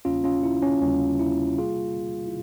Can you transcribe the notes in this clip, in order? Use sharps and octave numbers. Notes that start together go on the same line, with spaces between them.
E2 C#3 G3 A#3 C#4 F4
C#4 F4
E4
C#4
E2 C#3 G3 A#3 C#4
E4
C3 G3 A#3 F4 G#4
E4